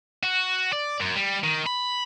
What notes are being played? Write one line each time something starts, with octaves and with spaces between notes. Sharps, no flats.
F#4
D5
F#2
G3
D#3
B5